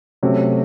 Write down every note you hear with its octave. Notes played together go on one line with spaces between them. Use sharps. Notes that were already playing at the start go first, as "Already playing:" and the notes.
C3 F#3 A3 C#4